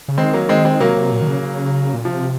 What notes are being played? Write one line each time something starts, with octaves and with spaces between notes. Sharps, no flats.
C#3
D#3 G#3 C4
F#3 A#3
G#3 C4
G#3 C4
C3 F#3 A#3
C3
A#2
D#3
C#3
C#3
A#2
C3 F3